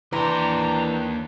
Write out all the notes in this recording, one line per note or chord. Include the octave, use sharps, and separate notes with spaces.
D#2 E3 D4 G5 A#5 C6